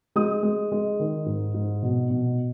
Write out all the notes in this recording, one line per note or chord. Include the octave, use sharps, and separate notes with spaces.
G#3 D#6
G#3
G#3
D#3
G#2
G#2
B2
B2